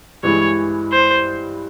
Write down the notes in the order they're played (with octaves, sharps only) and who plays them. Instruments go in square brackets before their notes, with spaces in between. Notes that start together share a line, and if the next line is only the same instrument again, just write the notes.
[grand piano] G2 E3 G#3 [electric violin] C#5
[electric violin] C5